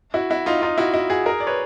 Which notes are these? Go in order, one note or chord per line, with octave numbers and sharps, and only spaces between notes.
E4 F#4
E4 F#4
D#4 F4
D#4 F4
E4 F#4
E4 F#4
F#4 G#4
G#4 A#4
D5
B4 C#5